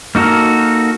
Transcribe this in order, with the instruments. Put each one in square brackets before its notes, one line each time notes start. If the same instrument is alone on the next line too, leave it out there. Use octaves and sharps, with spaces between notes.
[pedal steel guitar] A#3 D#4 F#4 A4 A#4